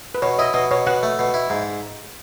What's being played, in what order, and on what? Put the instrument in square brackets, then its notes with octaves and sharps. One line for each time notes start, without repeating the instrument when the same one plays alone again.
[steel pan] B4
[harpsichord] B2 [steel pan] C#5
[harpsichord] E4 [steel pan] D#5
[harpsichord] B2 [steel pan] D#5
[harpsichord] B2 [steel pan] C#5
[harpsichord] B2 [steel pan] F#5
[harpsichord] A3
B2
E4
G#2